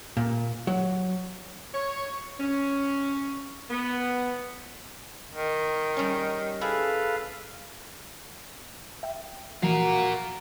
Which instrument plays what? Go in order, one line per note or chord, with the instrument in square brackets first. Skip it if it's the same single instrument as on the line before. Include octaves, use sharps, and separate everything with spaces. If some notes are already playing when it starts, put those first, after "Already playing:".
[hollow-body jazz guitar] A#2
F#3
[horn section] C#5
C#4
B3
[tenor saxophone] D#3
[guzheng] G3 C#4
[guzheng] E4 G#4 [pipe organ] A4 B4 F5
[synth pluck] E5 G5
[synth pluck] E3 F3 [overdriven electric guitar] F4 A#4 [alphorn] F#4